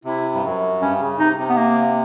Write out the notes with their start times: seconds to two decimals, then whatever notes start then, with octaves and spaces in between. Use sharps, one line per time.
0.04 C3 E4
0.34 G2
0.43 F#2
0.81 G2 C#4
1.00 C#3
1.19 C3 D#4
1.38 C3
1.49 B3
1.57 A#3